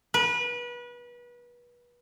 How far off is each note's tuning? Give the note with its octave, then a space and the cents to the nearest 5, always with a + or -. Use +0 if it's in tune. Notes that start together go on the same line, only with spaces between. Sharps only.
B4 -30